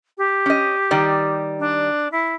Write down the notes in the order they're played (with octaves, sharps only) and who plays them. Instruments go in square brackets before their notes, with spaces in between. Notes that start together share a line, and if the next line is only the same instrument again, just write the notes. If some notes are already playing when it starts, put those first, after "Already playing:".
[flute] G4
[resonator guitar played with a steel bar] C#4 D#5
D#3 G3 D5
[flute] D4
E4